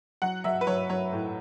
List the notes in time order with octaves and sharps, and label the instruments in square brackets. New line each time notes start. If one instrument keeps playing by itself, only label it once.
[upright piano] F#3 F#5
F#3 E5
B4
F#3 C#5
F#3 C#5
A2